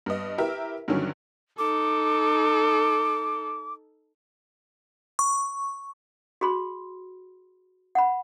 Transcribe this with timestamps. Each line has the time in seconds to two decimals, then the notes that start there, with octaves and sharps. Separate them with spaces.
0.06 G2 B3 D#5
0.38 E4 G4 A#4 B4 E5
0.88 G2 D3 D#3 F#3 C#4
1.58 D#4 A4 D6
5.19 C#6
6.41 F#4 G#4 B5 C6
7.95 F#5 B5